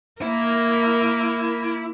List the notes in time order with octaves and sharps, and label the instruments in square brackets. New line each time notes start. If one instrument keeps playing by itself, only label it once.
[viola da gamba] A#3 A#4 [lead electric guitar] E4